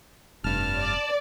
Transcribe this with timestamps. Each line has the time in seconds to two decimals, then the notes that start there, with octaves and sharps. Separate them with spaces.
0.44 F1 G2 A5 F6
0.77 D5